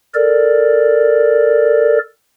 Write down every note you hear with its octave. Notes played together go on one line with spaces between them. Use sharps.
A4 A#4 D5